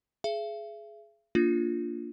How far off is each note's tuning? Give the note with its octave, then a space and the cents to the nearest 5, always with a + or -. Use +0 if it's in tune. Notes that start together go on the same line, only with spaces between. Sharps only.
G#4 +20 E5 +40
A#3 +0 D4 -5 F4 +0